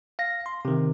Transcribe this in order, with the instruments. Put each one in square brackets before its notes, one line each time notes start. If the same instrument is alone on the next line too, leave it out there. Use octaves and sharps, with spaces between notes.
[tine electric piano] F5 A#6
C6
C3 D#3